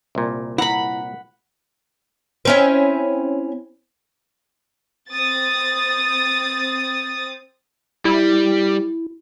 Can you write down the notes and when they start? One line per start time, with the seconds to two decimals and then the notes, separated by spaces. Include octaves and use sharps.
0.15 C2 A#2
0.58 E4 A#4 F#5 A#5 B5
2.45 C4 C#4 E4
5.11 C4 D#6 A6
8.05 G3 E4